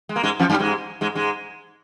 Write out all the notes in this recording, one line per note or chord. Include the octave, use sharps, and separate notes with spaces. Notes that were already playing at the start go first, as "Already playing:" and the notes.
G#3
A#3
G#2 G#3
F2 F3
G2 G3
G#2 G#3
G#2 G#3
G#2 G#3